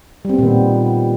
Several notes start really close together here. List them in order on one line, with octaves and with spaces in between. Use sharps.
G3 C4 B3 A#2 D#3